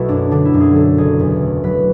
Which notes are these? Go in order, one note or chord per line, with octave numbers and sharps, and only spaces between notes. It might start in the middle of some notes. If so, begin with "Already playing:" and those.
Already playing: B1 B2 A3 E4 F#4
F#2 D4
D3 D4
E4
F#2
G#4
D3 A4
F#1 G#4
E2
A3
F#3 B4